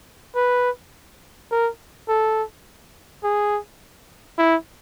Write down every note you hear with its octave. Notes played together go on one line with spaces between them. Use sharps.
B4
A#4
A4
G#4
E4